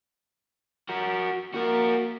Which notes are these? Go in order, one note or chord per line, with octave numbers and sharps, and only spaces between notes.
F#4 A#4
A#3 F#4 A#4